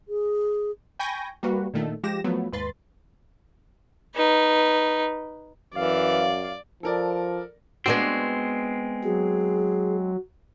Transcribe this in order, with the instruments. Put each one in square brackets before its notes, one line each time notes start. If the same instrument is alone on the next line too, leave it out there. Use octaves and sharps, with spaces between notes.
[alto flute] G#4
[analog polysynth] G5 G#5 B5 C#6 G6 A#6
G3 A#3 F#4 B4
A#2 D3 D#3 A3
F3 G#3 G4 A#6 E7
F3 F#3 A3 B3
D#2 G#2 B4 C6 A6
[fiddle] D#4 B4
[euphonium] F#2 [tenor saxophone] E3 [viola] D5 [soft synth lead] F5
[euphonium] F3 [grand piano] A4 A#4 D5
[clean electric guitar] G#3 C4 [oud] B3 D4 F#4
[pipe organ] F#3 [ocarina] G#4